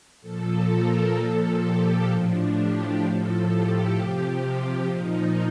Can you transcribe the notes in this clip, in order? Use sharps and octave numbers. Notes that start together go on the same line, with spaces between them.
A#2 F3 A4
A#4
A#2 F3 A4
G4
A2 F3 D4
G4
A2 F3 A4
G4
C3 F3 G4
A#2 F3 D#4